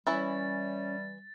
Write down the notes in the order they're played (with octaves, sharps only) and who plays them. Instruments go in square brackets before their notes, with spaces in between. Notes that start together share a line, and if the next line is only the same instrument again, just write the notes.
[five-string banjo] E3 E4 C#5 [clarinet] G3 [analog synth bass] C#4 [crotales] A6